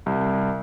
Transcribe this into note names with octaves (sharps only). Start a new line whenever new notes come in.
C2